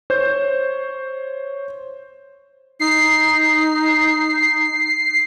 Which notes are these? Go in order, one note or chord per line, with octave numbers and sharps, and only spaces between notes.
C5 C#5 G6
D#4 C7